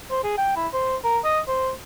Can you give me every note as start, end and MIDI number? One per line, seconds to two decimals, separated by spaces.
0.11 0.20 72
0.24 0.38 68
0.38 0.52 79
0.56 0.67 64
0.73 0.96 72
1.04 1.19 70
1.24 1.40 75
1.48 1.71 72